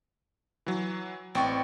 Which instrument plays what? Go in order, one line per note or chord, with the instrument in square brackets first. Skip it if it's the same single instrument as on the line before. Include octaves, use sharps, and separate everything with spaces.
[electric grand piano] E3 F#3
[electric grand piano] A1 C#6 [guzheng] C4 D5